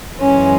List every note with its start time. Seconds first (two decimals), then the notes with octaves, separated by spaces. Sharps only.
0.20 F#2 E3 G#3 C#4